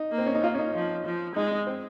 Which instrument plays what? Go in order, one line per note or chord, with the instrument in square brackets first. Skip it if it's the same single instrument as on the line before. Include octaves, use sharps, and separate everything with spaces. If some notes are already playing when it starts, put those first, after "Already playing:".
Already playing: [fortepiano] D#4
[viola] A#3
[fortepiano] C4
C#4
D#4
[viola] A#3 [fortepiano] F4
[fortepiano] C#4
D#4
[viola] F3
F3
[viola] G#3 [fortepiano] D#4
[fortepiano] D#4
C4